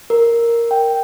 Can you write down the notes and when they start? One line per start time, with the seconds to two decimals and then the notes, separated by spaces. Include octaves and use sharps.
0.10 A#4
0.71 G5